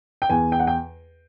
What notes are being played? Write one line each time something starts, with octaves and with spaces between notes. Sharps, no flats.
G5
E2 G#5
G5
F#5
G5